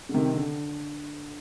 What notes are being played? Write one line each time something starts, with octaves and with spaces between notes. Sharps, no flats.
D3
C3 D#3
D3